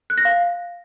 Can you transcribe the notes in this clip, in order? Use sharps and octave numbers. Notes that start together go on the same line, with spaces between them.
F#6
A#6
F5